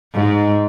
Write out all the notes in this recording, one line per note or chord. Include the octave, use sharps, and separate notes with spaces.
G#2